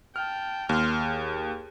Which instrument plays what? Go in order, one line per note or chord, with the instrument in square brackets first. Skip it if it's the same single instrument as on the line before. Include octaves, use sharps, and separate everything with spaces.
[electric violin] G5 A5 [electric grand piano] F6
[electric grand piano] D#2 [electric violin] C6 F6
[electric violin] G#4